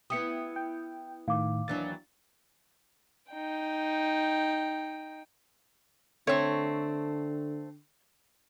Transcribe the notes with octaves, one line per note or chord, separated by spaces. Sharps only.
B3 E4 G4 D#6 C#7
G5
A2 D#3 F5 D6
D#2 E3 F#3 D4 A6
D#4 G5
D3 A3 C4 C#5